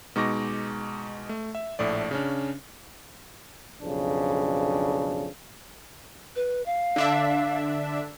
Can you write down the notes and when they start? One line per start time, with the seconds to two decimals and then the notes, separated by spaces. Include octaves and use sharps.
0.16 B2 G#3 D#4 C#6 D6 A#6
1.29 A3
1.55 E5
1.79 A#1 A2 A3 D5
2.11 C#3 C#4 D4
3.82 B1 F2 C#3 D4
6.36 B4
6.66 F5
6.96 D3 D4 E5